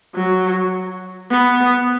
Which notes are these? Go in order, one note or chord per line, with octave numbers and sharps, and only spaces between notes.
F#3
B3